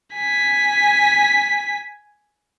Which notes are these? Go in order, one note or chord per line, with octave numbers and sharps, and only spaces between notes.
G#5 B6